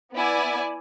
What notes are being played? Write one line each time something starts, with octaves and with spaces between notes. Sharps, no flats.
B3 E4 D5 G#5